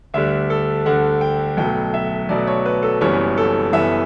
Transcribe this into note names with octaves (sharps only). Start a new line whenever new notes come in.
D2 D3 G3 E5
A4
D2 D3 G3 F#5
G5
B1 B2 F#3 A3 G5
E5
B1 B2 F#3 A3 D5
C#5
B4
A4
F#1 F#2 E3 G3 B3 C#5
A4
F#1 F#2 E3 G3 B3 E5